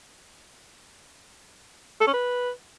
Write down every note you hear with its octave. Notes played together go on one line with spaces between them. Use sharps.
A4
C#4
B4